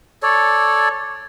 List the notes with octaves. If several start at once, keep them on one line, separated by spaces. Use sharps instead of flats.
A4 C#5 D5